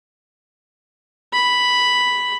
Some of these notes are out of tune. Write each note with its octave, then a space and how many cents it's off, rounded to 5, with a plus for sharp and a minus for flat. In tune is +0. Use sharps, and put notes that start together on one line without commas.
B5 +0